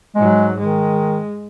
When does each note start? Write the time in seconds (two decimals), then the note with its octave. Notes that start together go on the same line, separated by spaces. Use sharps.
0.15 G#2 F#3 G#3
0.59 D#3 G#3